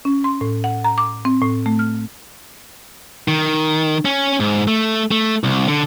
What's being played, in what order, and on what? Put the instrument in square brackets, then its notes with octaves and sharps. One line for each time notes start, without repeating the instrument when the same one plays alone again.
[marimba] C#4
C6
A2
F#5
A#5
D6
C4
A2
A3
F6
[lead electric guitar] D#3
C#4
G#2
A3
A3
C2
D3